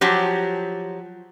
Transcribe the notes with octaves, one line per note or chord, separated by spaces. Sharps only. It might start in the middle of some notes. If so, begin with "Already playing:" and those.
F3 F#3 G4